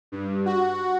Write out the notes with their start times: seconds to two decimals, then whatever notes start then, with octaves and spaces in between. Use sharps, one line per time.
0.12 G2
0.46 F#4